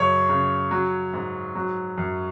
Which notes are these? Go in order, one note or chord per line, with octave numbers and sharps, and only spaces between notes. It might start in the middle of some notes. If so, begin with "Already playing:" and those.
Already playing: F#2 C#3 C#5
C#3
F#3
G#2
F#3
F#2